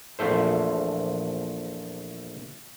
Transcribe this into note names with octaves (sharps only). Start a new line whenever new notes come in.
A#1 E2 F3 A3 C5